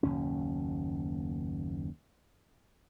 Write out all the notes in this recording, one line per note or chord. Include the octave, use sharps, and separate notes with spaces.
F#1 D#2 B2 C#4